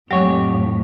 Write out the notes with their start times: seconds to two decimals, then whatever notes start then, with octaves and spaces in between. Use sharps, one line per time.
0.11 F2 A2 F#3 G#3 G4 C#5